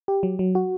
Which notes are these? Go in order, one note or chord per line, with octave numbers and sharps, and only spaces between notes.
G4
F#3
F#3
F#4